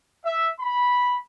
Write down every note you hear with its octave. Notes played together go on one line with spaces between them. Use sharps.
E5
B5